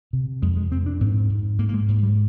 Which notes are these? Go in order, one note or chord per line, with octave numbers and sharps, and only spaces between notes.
C3
F2 G#3
G#3
F2 C4
D4
G#2 C4
G#2
G#2 A#3
A#3
G#3
G#2
G3